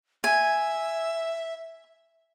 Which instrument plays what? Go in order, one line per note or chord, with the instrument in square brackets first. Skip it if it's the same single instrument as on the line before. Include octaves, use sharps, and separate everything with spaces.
[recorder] E5 [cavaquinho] G#5